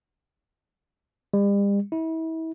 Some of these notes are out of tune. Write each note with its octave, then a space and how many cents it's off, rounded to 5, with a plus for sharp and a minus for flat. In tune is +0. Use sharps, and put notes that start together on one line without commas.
G3 +40
E4 -35